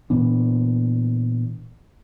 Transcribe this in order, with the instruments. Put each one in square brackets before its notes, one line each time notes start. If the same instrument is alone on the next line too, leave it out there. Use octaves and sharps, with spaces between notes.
[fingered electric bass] A#2 E3 B3 D4